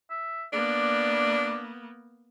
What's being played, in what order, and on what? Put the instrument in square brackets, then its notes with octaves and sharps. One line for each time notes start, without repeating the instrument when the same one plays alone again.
[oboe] E5
[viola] A#3 B3 [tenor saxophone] D4 [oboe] D5